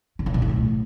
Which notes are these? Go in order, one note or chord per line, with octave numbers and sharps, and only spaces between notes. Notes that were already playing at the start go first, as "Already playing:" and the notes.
C#3
C3
B2
A#2
A2